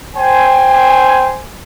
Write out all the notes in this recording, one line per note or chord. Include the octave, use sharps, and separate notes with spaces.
C5 G5 G#5